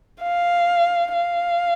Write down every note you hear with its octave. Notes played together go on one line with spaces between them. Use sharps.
F5
F5